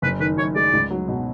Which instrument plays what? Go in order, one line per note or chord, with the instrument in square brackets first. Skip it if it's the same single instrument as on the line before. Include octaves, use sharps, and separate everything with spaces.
[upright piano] F#1 [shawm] B4
[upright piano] D#3 [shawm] B4
[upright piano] F#2 [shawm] C#5
[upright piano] G#3 [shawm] D5
[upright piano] C#2
F#3
B2